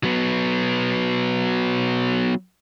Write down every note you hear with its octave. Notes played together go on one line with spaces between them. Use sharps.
F#3 B3